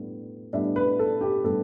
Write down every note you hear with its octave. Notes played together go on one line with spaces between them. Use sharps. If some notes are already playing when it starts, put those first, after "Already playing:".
Already playing: A2 G3 B3 D4
A2 G3 B3 D4 E5
B4
A4
G4
A2 G3 B3 D4 A4